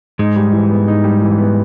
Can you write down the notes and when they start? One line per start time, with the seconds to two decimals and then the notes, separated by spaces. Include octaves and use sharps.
0.19 G#2 G#3 D#4
0.36 G3
0.53 E3
0.71 B3
0.88 D#4
1.04 G3
1.22 E3
1.38 B3